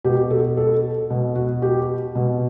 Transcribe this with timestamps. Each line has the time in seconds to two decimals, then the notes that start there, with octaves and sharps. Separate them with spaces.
0.04 B2 G4
0.30 A4
0.57 A4
1.10 B2
1.35 F#4
1.62 G4
2.15 B2